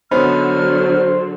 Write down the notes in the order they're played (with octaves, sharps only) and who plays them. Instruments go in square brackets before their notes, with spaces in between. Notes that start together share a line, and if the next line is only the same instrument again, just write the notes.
[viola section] D3 F#3 [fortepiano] B3 C#4 D#4 [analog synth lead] C5 [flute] F6